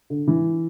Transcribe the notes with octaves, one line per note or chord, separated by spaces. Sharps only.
D3
E3